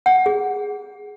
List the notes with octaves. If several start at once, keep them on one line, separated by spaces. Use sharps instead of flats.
F#5
G#4